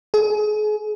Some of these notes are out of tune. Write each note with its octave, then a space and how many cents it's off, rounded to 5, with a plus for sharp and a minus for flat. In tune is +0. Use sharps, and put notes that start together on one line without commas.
G#4 +35